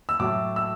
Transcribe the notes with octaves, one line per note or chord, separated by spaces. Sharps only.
E6
A2 F#3 A3 D6
E6